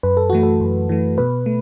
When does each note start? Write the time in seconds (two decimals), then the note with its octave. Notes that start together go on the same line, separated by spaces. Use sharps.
0.03 F#2 B4
0.17 A4
0.30 E3 A3 F#4
0.43 A4
0.61 F#2
0.89 E3 A3
1.18 B2 B4
1.46 A3